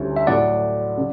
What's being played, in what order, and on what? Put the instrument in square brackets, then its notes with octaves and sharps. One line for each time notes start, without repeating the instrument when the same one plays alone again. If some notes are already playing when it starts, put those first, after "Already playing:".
Already playing: [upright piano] D2 D3 G3 C#4 E4
[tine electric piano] E5
[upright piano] A2 F#3 A3 [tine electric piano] D5 F#5
[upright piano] C#3